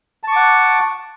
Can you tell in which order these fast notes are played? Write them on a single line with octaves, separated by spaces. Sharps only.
A5 C#6 D6 F#5